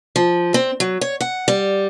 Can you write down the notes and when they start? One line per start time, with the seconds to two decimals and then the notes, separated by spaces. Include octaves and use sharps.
0.16 F3
0.54 C4
0.80 F#3
1.01 C#5
1.20 F#5
1.48 G3